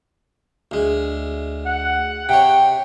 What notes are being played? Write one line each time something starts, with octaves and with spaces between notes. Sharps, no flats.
D2 G#3
F#5
C3 C#5 G5